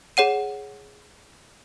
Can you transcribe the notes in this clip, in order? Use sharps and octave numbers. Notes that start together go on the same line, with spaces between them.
G#4 C#5 F#5 D#7